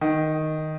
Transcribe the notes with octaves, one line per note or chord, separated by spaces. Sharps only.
D#3